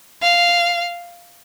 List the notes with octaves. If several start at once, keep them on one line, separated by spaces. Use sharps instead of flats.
F5